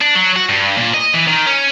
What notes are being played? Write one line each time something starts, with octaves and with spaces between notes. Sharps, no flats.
D4
F#3
F#4
G2
A#2
D#5
E3
D#3
C#4